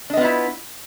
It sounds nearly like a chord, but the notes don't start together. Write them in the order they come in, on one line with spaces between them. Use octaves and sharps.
D4 D#5 B3 F4 E4